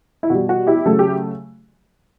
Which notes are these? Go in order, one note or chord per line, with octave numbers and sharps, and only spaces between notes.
E4
B2 G3 F#4
F#4
E4 G4
C#3 F#3 A3 A4
G4